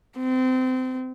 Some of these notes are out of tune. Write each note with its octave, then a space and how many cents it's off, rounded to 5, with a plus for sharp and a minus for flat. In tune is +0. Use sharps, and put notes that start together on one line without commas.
C4 -25